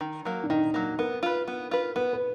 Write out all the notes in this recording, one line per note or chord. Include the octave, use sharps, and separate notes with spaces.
D#3
F#3 A#3
D4
D#3 D#4
F#3 A#3
B3 A#4
F4 B4
B3
F4 B4
B3 B4
B4